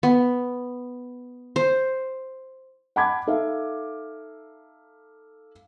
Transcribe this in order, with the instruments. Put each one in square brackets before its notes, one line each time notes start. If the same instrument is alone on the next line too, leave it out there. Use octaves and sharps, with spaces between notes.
[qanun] B3
C5
[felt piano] F#5 A5 B5 D6 G#6
D#4 A4 E5 F5